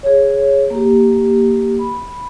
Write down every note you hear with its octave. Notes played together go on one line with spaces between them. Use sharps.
G#4 C#5
A#3 G4
B5